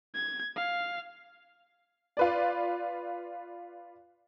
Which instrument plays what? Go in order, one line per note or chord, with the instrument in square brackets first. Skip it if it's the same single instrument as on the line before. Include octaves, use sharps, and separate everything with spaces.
[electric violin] G#6
F5
[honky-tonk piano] F4 B4 D5